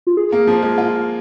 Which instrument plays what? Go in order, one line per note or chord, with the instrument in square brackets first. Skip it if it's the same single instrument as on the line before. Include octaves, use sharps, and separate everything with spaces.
[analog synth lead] F4
G#4
[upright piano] A#3
F3
G#3
F4